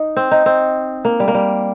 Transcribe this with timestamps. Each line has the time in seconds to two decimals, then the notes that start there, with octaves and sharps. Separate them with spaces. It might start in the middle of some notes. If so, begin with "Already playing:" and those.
Already playing: D#4
0.17 C4
0.31 D#4
0.46 C4
1.05 A#3
1.20 G3
1.28 A#3
1.35 G3